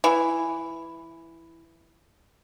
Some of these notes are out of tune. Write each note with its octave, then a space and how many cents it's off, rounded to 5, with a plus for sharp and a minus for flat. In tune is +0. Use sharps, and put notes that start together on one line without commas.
E3 +5